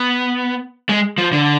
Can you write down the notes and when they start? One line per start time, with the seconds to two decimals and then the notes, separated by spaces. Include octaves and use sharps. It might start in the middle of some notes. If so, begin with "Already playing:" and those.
Already playing: B3
0.89 G#3
1.18 F3
1.32 D3